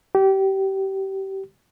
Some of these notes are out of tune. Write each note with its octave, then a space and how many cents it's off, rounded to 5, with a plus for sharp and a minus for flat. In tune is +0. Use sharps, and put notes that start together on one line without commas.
G4 -25